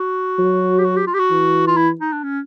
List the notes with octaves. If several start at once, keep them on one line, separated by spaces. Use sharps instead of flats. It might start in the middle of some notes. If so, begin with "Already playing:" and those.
Already playing: F#4
F#3
G4
F#4
G4
F4
G4
F#4
E3
F4
E4
D#4
D4
C#4